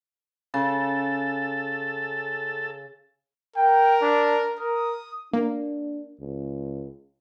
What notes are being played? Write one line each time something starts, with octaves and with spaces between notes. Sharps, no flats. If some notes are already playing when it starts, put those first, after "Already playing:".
C#3 A4
A#4 G5
D4
A#4 D#6
A#3 D4
C#2